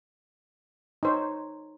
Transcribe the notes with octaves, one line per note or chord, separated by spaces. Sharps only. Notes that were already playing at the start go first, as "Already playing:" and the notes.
D#4 C5 C#5